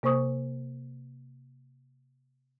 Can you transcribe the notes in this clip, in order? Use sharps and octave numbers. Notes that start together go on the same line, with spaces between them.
C3 A#3 C5 C#6 D#6